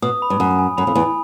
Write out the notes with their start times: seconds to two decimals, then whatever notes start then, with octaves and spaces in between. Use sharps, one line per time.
0.02 B2 D#6
0.22 B5
0.30 G2
0.40 F#2 D#6
0.59 G#5
0.78 F#2 B5
0.87 F2
0.95 E2 G#5